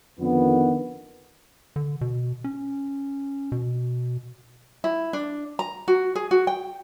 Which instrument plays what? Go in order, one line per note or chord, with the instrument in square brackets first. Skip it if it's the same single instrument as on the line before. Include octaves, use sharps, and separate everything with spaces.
[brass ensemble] F2 D3 D#3 B3
[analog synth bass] D3
B2
C#4
B2
[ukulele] E4
D4
A#5
F#4
G#4
F#4
G5